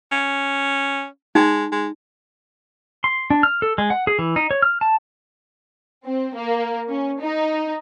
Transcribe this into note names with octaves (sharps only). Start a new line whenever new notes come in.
C#4
G#3 D#4
G#3
C6
D4
F6
A4
G#3
F#5
G#4
E3
D#4
C#5
F6
A5
C4
A#3
C#4
D#4